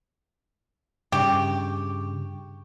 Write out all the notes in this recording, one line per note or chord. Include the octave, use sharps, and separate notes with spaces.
G2 C#3 G4 C#6